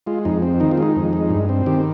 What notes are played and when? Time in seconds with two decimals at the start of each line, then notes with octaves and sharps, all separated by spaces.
0.07 G#3 F4
0.25 F2 D#4
0.42 C4
0.60 D#3 D#4
0.71 F4
0.78 G#3 D#4
0.96 F2
1.13 G#3
1.30 G2
1.49 C4
1.66 D#3 G4